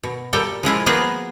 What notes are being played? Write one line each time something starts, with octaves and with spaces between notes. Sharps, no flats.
B2
A#2 G3 A4 G5
F3 G#3 E4 F4
F3 A#3 B3 F4 F#4 G#4